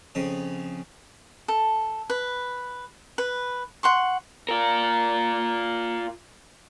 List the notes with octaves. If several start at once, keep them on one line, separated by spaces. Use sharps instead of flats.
F2 C#3 D#6
A4
B4
B4
F#5 C6 C#6
F4 A#4